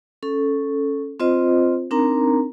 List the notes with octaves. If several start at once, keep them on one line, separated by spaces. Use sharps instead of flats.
C#4 A4
C4 F4 C5 D#5
C4 D4 D#4 A#4 A#5